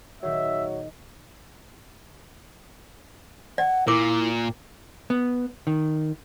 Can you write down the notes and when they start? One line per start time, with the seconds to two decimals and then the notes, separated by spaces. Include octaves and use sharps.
0.23 A#2 D#3 F#3 G#4 E5
3.58 D5 F#5
3.88 A#2 E4 A#4 D6
5.10 B3
5.67 D#3